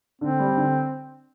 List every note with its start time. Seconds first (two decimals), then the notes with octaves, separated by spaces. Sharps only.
0.21 D3 C4
0.39 G3
0.57 D3